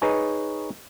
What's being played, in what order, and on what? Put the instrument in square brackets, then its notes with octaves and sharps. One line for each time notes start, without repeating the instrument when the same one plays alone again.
[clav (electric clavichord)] D#4 G#4 B4 C#5 G#5 A#5